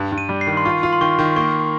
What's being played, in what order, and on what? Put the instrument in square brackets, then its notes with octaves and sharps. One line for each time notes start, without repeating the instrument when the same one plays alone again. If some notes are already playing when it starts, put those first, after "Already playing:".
Already playing: [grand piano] G2
G2
[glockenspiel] D#7
[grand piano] G3
[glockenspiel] C7
[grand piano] D#3
[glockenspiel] C6
[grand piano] F4 [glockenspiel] C#6
[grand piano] F4
[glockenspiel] C6
[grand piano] D#3 [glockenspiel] C#6
[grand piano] D#3
[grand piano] A#3 [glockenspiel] C#6